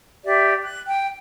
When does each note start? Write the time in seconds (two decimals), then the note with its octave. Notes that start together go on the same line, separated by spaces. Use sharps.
0.25 G4 D5 E5
0.62 F#6
0.88 G5